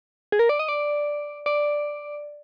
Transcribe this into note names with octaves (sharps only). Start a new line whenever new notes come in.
G#4
A#4
D5
D#5
D5
D5